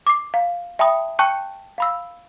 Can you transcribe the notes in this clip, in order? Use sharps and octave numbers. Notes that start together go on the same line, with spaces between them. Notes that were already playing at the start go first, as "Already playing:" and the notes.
D6 C7
F5
E5 G5 A5 B5 D#6
G5 A5 C#6 F#6 G6 C#7
F5 B5 E6